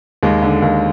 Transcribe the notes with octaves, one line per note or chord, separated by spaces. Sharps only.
D#2 G#3
D3
D#2